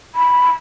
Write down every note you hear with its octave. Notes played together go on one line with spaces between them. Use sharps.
B5